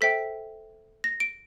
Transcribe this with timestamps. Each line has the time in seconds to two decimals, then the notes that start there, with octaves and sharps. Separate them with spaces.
0.01 A4 C5 E5 G5 B6
1.04 A#6
1.20 D7